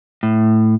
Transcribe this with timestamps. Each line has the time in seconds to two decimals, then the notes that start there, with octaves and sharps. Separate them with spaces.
0.23 A2